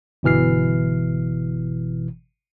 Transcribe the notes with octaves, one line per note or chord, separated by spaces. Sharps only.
G1 B2 E3 F6 C7